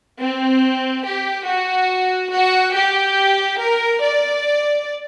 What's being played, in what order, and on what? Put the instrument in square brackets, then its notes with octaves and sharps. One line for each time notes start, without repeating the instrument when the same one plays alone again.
[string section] C4
G4
F#4
F#4
G4
A#4
D5